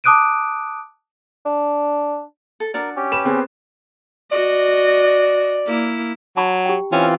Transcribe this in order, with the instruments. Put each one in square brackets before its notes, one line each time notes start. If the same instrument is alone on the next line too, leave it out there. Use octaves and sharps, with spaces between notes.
[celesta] A5 D6 D#6 F#6 D7 D#7
[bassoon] D4
[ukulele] A4
[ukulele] D4 F#4 D5 [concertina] A#4
[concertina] C#4 G4
[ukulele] B4 [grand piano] E7
[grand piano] B3 C4 G#4
[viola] F#4 D#5 [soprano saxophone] D5
[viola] A#3 E4
[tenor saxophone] F#3 [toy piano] A5 B5 C#6
[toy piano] G4 G5
[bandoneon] E3 C4 F4 [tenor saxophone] C#4